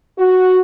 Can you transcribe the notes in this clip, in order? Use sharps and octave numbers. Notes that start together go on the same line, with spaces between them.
F#4